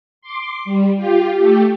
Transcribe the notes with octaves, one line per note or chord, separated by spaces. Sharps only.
C6 D6
G3
F4 G4
A3 G4